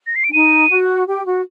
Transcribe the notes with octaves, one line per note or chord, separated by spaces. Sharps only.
A#6
C7
D7
D4
D#4 D#7
F#4
G4
F#4